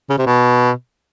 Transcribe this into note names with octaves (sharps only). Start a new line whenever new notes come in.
C#3
C3
B2